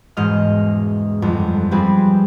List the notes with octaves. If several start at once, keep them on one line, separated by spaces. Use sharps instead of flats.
E1 G#2 D#5 F6
G1 F2
F3 G3 C4 G#4 B4